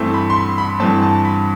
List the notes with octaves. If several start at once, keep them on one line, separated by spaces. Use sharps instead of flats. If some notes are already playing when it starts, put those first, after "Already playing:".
Already playing: G2 E3 A3 C4
B5
C6
B5
B5
G2 E3 A3 C4 A5
A5
B5